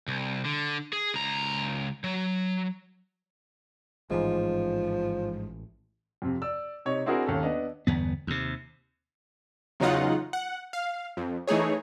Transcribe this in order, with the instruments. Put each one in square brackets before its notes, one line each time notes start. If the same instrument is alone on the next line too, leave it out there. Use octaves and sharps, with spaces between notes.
[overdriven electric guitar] C2
D3
G#4
C#2 A#5
F#3
[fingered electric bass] A1 E3 [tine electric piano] G#2 G#3 [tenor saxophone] F3
[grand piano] F2 C3
D5 E6
C3 D#4 C#5
C4 D4 E4 F#4 G#4 A#4
D#2 C#4 A4
B3 D4 D#5
[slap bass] G1 E2 B3
D#2 C3
[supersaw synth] E2 C#3 F#3 D#4 F4 F#5
F#5
F5
F2
E3 A3 D#4 G#4 C#5